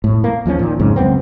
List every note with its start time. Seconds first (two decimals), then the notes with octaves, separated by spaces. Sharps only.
0.04 A2
0.24 A#3
0.46 D#2 F3 G3 C#4
0.59 A#2 D#3
0.79 F2 G#2 C#3
0.96 C#2 F#2 B3 C4